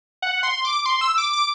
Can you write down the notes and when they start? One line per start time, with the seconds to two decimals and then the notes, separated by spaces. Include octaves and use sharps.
0.22 F#5
0.43 C6
0.65 D6
0.86 C6
1.01 E6
1.18 D6
1.33 D6